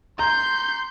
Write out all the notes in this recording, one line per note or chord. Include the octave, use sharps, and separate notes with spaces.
A#5 C6 G6